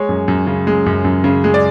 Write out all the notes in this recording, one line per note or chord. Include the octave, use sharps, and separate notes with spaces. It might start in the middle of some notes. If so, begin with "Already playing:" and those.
Already playing: G#3 C#5
F#2
F#2
C#3
G#3
F#2
F#2
C#3
G#3
D5